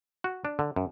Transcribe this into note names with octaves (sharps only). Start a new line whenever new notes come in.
F#4
D4
D3
F#2